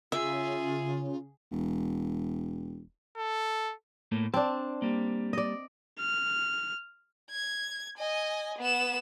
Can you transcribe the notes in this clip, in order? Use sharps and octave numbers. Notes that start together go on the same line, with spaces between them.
C#3 F4 G#4 E5
E1
A4
A2 A3 A#3
C4 D4 A5
G3 A#3
D5 D#5
F6
G#6
D#5 G#5
B3 E7